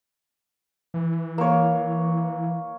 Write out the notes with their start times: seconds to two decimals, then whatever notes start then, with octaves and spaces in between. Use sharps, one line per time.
0.94 E3
1.38 A#3 C#5